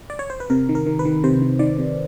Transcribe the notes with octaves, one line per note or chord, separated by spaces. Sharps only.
D5
C#5
C5
B4
C3 A#4
D#3
A#4
D#3
B4
D#3
C3 C5
C3
D#3 D5
C3